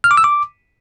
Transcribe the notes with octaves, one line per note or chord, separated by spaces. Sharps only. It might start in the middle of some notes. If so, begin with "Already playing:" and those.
F6
D6
E6
D6